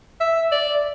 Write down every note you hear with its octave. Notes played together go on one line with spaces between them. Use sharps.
E5
D5